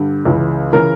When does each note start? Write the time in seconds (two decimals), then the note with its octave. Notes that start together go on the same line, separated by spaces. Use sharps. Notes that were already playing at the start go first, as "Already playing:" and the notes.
Already playing: G2 D3 G3
0.25 C#2 C#3 E3
0.72 C#3 E3 A#4